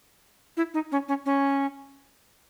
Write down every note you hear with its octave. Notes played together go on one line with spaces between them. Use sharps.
E4
D#4
C#4
C#4
C#4